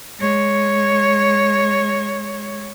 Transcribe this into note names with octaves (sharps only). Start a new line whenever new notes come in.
G#3 C#5